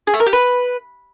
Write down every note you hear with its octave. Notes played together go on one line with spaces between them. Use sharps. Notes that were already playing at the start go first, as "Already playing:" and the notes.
G#4
A3
A#4
G4
B4